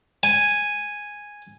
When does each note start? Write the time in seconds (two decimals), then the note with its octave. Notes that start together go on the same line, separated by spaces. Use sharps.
0.23 G#5